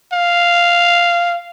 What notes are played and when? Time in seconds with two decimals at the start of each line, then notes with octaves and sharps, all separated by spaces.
0.13 F5